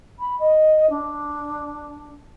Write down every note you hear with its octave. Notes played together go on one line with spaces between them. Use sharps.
B5
D#5
D4